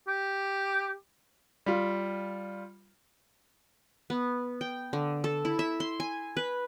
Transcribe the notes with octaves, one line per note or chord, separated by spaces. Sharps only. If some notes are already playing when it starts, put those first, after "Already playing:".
G4
G3 F4
B3
G5
D3
A4
E4
E5
C6
G#5
B4